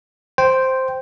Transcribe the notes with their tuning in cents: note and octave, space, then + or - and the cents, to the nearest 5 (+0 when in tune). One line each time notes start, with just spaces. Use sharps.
C5 +0 G5 -5